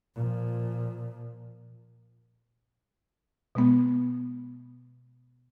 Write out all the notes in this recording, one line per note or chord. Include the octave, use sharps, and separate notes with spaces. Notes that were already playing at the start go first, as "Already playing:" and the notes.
A#2 F3
B2 G#3 B3